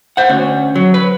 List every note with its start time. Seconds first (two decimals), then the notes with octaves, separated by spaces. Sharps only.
0.17 C5 F#5
0.29 D2 C#4
0.75 F#3
0.94 B4